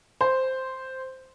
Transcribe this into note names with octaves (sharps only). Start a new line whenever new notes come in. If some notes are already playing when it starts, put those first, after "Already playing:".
C5